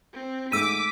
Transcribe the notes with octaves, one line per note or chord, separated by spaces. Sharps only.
C4
G#2 G#3 A3 D6 E6 B6 D#7